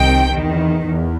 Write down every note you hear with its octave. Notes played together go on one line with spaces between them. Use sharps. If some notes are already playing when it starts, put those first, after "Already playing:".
Already playing: C2 C3 D#3 G5
E2 D#3
E2